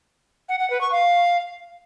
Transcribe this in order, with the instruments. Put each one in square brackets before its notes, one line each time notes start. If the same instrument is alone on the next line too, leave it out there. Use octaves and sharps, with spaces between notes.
[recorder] F#5
F#5
B4
C#6
F5